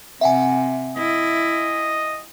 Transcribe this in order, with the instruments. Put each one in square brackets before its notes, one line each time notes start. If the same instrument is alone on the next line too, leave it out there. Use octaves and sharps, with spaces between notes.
[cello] C3 [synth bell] E5 F#5 G#5
[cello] E4 [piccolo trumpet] D#5